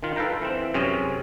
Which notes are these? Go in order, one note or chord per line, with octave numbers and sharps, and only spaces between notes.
D#3 F4
A4 B4 F5 G5 A#5
E3 C4
F#2 C3 C4 C#4 G#4